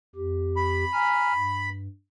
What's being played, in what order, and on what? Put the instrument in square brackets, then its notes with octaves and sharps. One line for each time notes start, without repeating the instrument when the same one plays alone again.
[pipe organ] F2 G4
[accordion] B5
[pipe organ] G#5 A#5 F6
G2